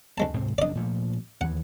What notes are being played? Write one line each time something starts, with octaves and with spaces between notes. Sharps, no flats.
D2 G#3 A5
G#2 C3 C4
F#1 A#2 D4 D5 D#5
A#2 F3 A3
D#2 E3 F#5